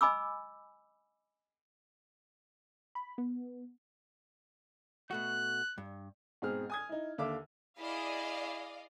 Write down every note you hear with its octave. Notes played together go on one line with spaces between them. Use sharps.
D#5 G#5 B5 D6 E6
B5
B3
B2 A3 F#4 F#6
G2
G#2 B2 C4 G#4 F6
G#5 D#6 G#6
D#4 E4
D#2 D3 E5 F5 D6 E6
E4 G#4 D5 D#5 F5